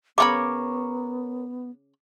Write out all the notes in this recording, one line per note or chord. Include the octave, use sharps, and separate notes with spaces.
C#3 B3 F4 A#4 C#5 B5 D6